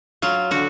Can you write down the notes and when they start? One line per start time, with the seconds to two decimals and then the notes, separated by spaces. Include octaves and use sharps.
0.22 F#3 F4
0.51 D3 F#4